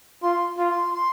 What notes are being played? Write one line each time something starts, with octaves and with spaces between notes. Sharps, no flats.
F4 C6
F4
C6
C6